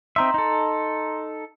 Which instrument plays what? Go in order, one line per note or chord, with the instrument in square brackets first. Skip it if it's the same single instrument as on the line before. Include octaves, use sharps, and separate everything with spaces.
[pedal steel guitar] C4 D#4 E5 [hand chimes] A#5 C6
[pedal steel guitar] D#4 A4